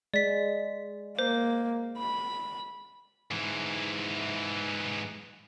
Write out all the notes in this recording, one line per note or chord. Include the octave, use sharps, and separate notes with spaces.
G#3 D5 B6
A#3 C5
B5
G#2 E3